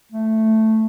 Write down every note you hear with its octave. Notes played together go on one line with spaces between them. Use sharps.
A3